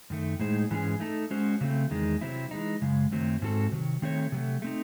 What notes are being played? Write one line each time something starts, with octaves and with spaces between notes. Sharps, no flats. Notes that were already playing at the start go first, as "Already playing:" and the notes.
F#2 D#3 A3
A2 G#3 D#4 G#4 C5
G#2 E3 G#3 C#4 G#4
A3 D#4 A4
G#3 C#4 F#4 C5
C#3 F#3 A3 C4
E2 D#3 G#3
C3 F#3 C4 E4
E3 G#3 D#4
F#2 C#3 G#3
F#2 D#3 F#3 A3 C4
G#2 F#3 C4 F#4 A4
C3 D#3 F#3
D#3 A3 C4 F#4 C#5
C3 F#3 A3
A3 C4 D#4